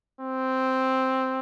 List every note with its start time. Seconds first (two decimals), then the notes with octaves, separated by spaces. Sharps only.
0.20 C4